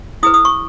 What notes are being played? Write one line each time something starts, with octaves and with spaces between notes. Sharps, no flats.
E4 G#4 B4 D#6
D#6
C#6